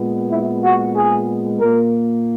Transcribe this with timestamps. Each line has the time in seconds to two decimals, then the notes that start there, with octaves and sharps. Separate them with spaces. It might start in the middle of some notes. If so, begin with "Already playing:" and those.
Already playing: A#2 G#3 B3
0.31 E4
0.64 F#4
0.96 G#4
1.60 A#2 A#3 A#4